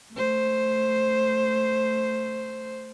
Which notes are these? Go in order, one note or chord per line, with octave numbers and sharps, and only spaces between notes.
A3 C5